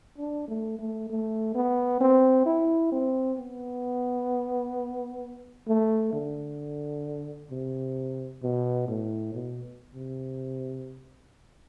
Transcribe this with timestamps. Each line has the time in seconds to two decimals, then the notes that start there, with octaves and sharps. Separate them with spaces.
0.18 D4
0.48 A3
0.79 A3
1.10 A3
1.55 B3
2.01 C4
2.46 E4
2.92 C4
3.39 B3
5.67 A3
6.13 D3
7.51 C3
8.43 B2
8.88 A2
9.34 B2
9.95 C3